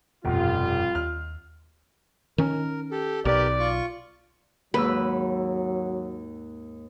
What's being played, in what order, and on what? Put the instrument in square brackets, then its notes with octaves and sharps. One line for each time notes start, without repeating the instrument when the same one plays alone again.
[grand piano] F1 [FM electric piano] G2 B2 [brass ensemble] G3 F4
[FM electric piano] D#2 [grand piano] F6
[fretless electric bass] D#3 C#4 [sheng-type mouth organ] A#4
[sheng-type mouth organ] G4 A4
[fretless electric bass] B1 [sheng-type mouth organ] G4 A#4 B4 [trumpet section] D5
[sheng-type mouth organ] F4 C#6
[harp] D#2 G#2 E6 [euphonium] F#3 [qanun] B4